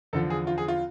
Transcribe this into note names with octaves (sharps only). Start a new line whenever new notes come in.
E2 D3 F3 A4
G#4
F4
G#4
F4